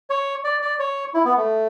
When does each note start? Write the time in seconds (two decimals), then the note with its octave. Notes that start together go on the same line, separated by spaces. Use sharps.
0.10 C#5
0.44 D5
0.62 D5
0.79 C#5
1.14 E4
1.25 B3
1.37 A3